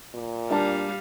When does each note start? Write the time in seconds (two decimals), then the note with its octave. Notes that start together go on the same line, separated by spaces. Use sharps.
0.15 A#2
0.50 G3 D4 F5 A5